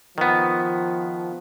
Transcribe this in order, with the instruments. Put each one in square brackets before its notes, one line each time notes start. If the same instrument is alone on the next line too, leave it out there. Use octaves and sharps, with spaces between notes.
[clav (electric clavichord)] D#3 B3 [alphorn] F3